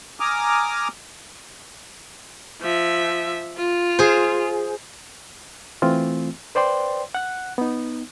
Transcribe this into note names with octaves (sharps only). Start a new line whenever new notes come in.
G#5 A#5 D6 D#6 F6
F3 E5
F4
G#4 C5
E3 A3 C4 F4
B4 C5 D5 G5 C6
F#5 F#6
B3 D#4